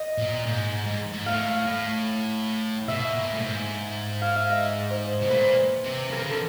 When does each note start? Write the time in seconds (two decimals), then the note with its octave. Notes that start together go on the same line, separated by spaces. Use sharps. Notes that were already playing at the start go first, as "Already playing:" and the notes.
Already playing: D#5
0.18 A#2
0.46 G#2
0.86 G#2
1.12 G#2
1.26 A2 F5
1.67 A2
2.88 B2 E5
3.15 A#2
3.34 A2
3.42 G#2
4.22 F5
4.36 E5
4.50 D#5
4.90 C5
5.21 B2
5.30 A#2 B4
5.84 C3
6.11 C#3 A#4
6.24 D3
6.30 A4